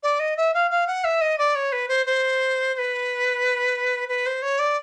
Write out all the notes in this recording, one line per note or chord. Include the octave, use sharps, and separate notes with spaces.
D5
D#5
E5
F5
F5
F#5
E5
D#5
D5
C#5
B4
C5
C5
C5
B4
B4
C5
C#5
D5